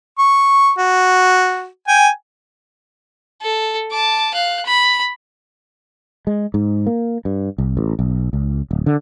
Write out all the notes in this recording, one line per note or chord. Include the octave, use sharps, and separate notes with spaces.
C#6
F#4
G5 G#5
A4
A5 D6
F5 F#6
B5
G#3
G#2
A#3
G2
C2
A1
B1
C#2
D1
D3